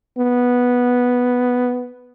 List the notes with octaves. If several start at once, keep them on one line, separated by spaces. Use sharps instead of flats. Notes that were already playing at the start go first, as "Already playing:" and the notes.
B3